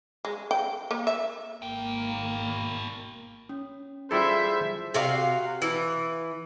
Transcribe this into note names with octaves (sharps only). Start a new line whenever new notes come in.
G#3
G5
A#3
E5
G#1 B2 A#3 G5
C#4
G3 E4 F4 G#4 A4 C5 E5
C3 F#4 F5
E3